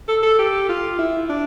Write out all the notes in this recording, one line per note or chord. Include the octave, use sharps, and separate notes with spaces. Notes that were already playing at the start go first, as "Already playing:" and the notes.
A4
A4
G4
F4
E4
D4